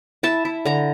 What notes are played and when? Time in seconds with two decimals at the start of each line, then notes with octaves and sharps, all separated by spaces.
0.23 E4 A5
0.45 E4
0.65 D3 A#5